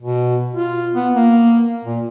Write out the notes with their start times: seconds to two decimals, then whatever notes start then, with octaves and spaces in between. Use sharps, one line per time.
0.02 B2
0.55 F4
0.94 B3
1.15 A#3
1.84 A#2